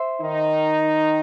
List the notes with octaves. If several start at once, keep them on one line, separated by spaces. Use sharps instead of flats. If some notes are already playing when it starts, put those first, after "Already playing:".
Already playing: C5 E5
D#3 D#4